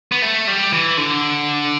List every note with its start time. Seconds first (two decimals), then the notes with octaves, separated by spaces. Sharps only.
0.12 B3
0.22 A3
0.47 G3
0.73 E3
0.97 D3